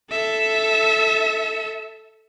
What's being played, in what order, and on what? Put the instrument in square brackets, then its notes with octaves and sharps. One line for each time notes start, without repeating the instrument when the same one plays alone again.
[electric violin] A4 E5